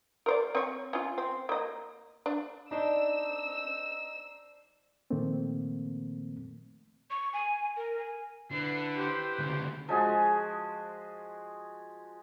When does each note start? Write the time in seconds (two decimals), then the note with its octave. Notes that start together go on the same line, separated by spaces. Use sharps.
0.26 A#4 C5 D5
0.55 C4 C#5
0.93 C#4 F4
1.18 C4
1.49 A#3 D#5
2.26 D4
2.71 D4 D#4 C5 E6
5.10 A#2 D#3 F3 A3 A#3 C4
7.11 C#6
7.33 G#5
7.77 A#4
7.99 G#5
8.51 D3 E4 B4 C7
8.95 G4 C5
9.39 D2 C#3
9.89 F3 G#3 F#4 G#4